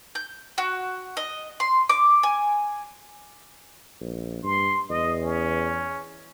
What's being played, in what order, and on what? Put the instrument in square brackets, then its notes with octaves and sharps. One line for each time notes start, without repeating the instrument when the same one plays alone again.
[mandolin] G6
F#4
D#5
C6
D6
G#5
[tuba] A#1
[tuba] G2 [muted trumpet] C6
[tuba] E2 [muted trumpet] D#5
[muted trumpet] C#4